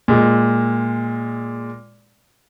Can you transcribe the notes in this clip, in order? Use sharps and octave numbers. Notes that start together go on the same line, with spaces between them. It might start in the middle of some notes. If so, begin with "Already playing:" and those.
A#2 G#3